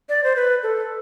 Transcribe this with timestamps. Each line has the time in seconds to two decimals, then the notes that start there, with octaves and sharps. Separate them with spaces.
0.09 D5
0.24 C5
0.36 B4
0.63 A4